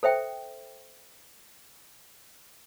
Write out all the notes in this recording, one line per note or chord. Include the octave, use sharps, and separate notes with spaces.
A4 C5 E5 G5